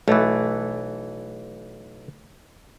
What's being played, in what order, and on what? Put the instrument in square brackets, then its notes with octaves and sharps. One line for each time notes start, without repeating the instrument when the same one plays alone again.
[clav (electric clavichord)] B1 E3 [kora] A3